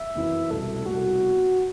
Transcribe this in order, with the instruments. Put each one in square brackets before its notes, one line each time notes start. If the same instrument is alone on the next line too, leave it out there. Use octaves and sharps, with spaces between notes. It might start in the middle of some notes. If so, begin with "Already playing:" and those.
Already playing: [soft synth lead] E5
[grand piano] F#2 E3 B3 E4 B4
[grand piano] C2 B2 A3 [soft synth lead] A4
[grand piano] C2 B2 A3 [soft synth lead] F#4